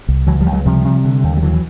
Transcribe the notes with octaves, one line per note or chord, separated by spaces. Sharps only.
C2
C#2 E3 F#3
F3 G3
C#2
F#3 G#3
C3 F3 G3
C3
D3
D#2
G3
D3 E3 F#3
E3